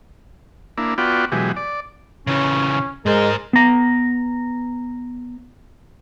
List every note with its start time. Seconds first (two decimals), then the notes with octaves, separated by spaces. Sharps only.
0.78 A#3 D4 E4
0.98 B3 F4 F#4 D5 G5
1.32 B2 E3 F#3 G#3 G4
1.57 D5
2.27 C#3 E3 C#4
3.06 G#2 G#3 A#4 C5
3.53 B3 A#5